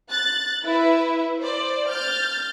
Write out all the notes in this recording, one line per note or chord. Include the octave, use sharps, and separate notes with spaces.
F#6 A6
E4 B4 E5
C5 D5
F6 G6 A6